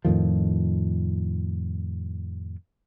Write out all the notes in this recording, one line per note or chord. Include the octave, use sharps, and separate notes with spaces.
F2 A2 D#3 F3